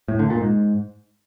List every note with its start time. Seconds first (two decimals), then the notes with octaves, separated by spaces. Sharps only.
0.08 A2
0.19 D3
0.30 A#2
0.41 G#2